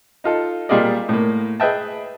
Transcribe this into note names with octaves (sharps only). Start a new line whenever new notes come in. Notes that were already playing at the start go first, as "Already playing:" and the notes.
D#4 F4 A4
A#2 G3 F4 G#4 D5 D#5
A2 A#3
G#4 B4 D#5 E5 G5 A5